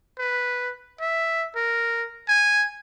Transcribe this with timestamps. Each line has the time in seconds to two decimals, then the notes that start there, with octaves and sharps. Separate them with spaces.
0.18 B4
1.00 E5
1.56 A#4
2.28 G#5